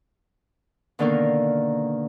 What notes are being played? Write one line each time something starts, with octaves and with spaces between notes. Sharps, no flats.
B2 D3 D#3 A#3 A#4 F5